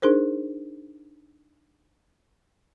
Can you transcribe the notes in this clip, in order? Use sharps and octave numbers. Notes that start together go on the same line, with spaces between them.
D4 D#4 G#4 A#4 C5